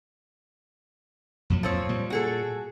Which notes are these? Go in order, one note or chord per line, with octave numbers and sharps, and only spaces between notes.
F2 A#2 F#3
F3 C4 C#5
A#2 G3
F#4 G#4 A4